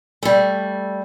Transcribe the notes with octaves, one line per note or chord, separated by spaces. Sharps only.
G3 A3